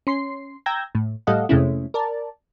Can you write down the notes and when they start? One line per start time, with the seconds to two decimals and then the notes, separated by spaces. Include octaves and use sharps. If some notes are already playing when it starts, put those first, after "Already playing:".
0.07 C#4 C6 C7
0.66 G5 A#5 E6 G6 G#6 A#6
0.95 A2
1.27 A2 G3 A4 D#5 F5 F#5
1.49 F2 C3 G#3 A3 C#4 E4
1.94 A#4 D5 A5